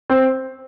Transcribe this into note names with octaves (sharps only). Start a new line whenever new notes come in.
C4